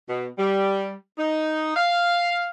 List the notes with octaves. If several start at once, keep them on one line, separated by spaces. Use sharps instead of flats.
B2
G3
D#4
F5